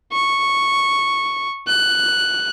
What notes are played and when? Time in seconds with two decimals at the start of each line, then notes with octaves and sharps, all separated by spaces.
0.13 C#6
1.67 F#6